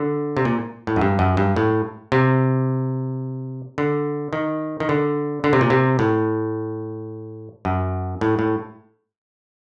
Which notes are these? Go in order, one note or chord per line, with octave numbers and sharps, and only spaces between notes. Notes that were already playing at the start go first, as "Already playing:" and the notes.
Already playing: D3
C3
A#2
A2
F#2
G2
F#2
G2
A2
C3
D3
D#3
D#3
D3
D3
C3
A#2
C3
A2
F#2
A2
A2